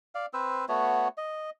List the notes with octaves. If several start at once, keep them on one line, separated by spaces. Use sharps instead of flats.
D5 F5
C4 B4 C5 E6
A3 B3 F#4 C#5
D#5